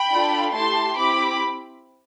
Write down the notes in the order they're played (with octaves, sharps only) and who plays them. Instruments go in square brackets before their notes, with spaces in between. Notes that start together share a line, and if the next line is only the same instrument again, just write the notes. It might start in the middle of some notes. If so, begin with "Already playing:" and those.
Already playing: [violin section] G5 B5
D4 F4 A4
A3 E4 G4 A5 C6
C4 E4 G4 B5 D6